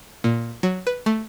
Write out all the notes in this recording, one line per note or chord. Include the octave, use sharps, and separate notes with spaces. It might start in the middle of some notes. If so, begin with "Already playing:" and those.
A#2
F#3
B4
A3